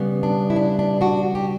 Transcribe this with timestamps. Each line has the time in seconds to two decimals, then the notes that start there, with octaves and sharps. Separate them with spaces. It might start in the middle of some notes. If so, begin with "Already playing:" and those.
Already playing: C#3 G3 B3
0.23 D4
0.50 E4
0.56 D4
0.79 D4
1.01 D4 F#4
1.35 G4